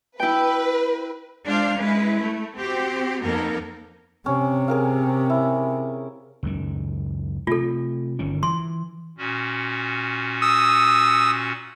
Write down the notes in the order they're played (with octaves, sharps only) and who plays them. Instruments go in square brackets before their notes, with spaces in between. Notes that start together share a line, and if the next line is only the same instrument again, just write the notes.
[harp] E4 G5 [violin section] B4
[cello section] G#3 D4 F4 C5 F5
G#3 C#4 E4 B4
A3
C4 F#4 G4 C5
F2 A#3 B3 D#4 A4 A#4
[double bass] C3 [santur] C#4
[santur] G#4 A#4 F5
E4
[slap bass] C#2 F#2 D#3
[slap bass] C3 A3 [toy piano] F4 A4
[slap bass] G1 D#3 C#4
[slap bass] E3 [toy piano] C6
[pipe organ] A#2 C#4 F#4
[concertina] D#6 E6